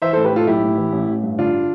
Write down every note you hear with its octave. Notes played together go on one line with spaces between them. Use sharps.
E3 C5 E5
A4 C5
A2
G4 B4
A2 F4 A4
B1 E4 G4
A2
E3
A1
A1
G2
D3 D4 F4